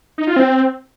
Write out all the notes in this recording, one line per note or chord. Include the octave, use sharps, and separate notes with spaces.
D#4
F4
C4